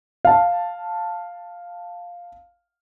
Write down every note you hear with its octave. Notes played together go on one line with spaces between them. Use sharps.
F5 A5